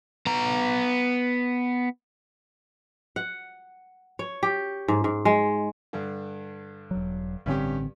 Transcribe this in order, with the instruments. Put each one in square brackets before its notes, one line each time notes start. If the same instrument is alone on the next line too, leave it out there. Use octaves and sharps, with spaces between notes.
[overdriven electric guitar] B3 A#5
[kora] F#5
C#5
G4
G#2
G#2
G#3
[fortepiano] G2 D3
[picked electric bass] E1 F#3
[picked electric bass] A1 D3 C4 [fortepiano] G2 C#4 G4